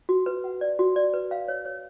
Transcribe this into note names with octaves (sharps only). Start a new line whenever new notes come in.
F#4
B4
F#5
D5
F#4
D5
B4
F5
C#5
C#5